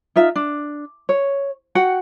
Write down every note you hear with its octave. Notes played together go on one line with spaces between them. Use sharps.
D#4 F4 E5
D4
C#5
F#4 F#5 G5